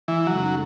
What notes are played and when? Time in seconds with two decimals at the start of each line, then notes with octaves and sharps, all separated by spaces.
0.08 E3
0.26 F#2 C#3 F#3 G#3 D#4 A4